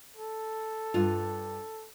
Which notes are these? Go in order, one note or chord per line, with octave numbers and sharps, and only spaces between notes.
A4
G2 F4